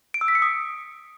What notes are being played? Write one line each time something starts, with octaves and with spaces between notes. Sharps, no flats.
D7
E6
B6
C#7
D#6